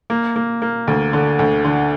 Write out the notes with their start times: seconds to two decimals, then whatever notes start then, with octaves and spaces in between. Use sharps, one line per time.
0.10 A#3
0.36 A#3
0.62 A#3
0.87 D2
1.13 D3
1.39 D2
1.65 D3